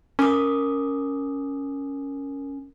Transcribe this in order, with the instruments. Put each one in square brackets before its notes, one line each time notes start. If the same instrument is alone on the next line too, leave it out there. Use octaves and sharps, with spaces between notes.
[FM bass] C#4 [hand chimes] A#4 D6 D#6